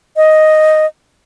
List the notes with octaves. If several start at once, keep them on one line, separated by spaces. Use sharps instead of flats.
D#5